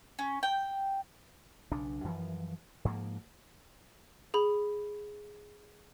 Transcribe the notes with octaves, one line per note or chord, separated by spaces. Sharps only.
C#4
G5
B1 C#3 D4
F#2 E3 F3
G#2 F3 A#3
G#4 B5